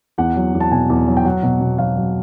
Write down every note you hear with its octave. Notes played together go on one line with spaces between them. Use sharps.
E2 F#5
F#3
E2
A5
B2 G#5
E2
F#3
G5
F#3 F#5
B2
B2
F#3 F5
F#3